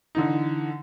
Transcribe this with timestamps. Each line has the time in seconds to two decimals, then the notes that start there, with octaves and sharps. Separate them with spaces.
0.15 D3 E3 D#4